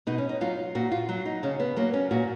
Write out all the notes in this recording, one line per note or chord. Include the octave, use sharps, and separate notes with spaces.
B2 D#4
C#4
D#4
F#3 F4
A#2 F#4
F4
F#3
D#4
C#3 C#4
B3
F#3 A#3
C#4
A#2 F#4